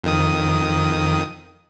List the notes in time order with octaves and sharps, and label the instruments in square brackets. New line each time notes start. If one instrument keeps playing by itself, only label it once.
[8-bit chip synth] F2 D#3 D#6